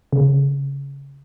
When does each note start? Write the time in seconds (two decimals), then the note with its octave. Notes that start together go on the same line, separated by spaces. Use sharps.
0.13 C#3